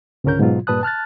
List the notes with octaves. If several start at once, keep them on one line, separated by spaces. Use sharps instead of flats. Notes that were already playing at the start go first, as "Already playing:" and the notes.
C#2 G#2 D3 C#4 A#4 G6
G#2 B2 F#3 F4
G2 A#2 B4 A5 D#6 F#6
A5 F6 F#6 A6